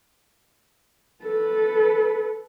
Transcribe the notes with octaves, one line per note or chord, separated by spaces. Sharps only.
A4 B4